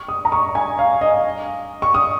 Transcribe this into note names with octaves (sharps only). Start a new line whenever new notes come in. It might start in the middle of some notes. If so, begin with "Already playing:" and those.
Already playing: C#6
D#6
A#5
C#6
G#5
F5
D#5
C#6
D#6